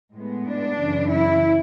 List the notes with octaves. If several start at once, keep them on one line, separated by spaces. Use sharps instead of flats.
A2 G#3 B3
D4
F#2 C#3 E3
E4